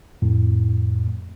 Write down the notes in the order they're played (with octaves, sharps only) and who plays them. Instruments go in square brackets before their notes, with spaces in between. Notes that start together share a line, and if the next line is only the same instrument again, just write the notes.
[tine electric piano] F2 A2